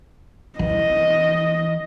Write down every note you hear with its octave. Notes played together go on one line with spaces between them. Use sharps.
E3 D#5